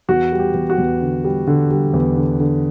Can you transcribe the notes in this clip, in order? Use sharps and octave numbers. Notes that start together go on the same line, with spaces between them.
E2 F#4
G3
G4
E2
F#4
E2
D3
G3
D3
G3
E2
D3
D3